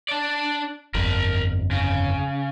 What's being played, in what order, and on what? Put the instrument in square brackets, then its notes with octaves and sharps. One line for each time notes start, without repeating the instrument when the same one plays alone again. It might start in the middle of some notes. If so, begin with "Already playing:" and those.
[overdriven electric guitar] D4 D5
[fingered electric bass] G1 F2 [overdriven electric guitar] A#4 B5
[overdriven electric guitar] C#3